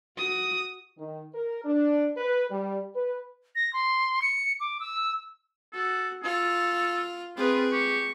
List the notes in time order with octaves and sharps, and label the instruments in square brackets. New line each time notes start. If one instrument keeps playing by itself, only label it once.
[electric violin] F#4 D#6
[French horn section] D#3
A#4
D4
B4
G3
B4
[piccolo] A#6
C6
C#7
D6
E6
[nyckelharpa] F#4 [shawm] A4
[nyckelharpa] F4 [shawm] A4
[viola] C4 B4 [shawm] F4 [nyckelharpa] G#4
[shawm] G4 [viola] C#6